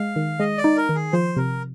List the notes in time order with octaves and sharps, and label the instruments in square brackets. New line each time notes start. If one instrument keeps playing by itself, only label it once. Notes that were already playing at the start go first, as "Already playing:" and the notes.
Already playing: [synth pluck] G#3 [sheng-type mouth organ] F5
[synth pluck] D#3
[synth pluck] G#3 [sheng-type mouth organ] D#5
[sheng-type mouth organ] D5
[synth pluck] D#4
[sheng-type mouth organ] A#4
[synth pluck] D#3
[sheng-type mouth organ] G#4
[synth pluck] F3 [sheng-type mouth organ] C5
[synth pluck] C3 [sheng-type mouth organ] A#4